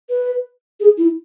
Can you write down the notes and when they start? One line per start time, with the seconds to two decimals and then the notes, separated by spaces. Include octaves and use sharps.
0.09 B4
0.80 G#4
0.98 E4